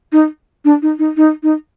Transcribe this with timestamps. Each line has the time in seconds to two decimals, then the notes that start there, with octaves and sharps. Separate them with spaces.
0.12 D#4
0.65 D4
0.82 D#4
0.99 D#4
1.17 D#4
1.43 D#4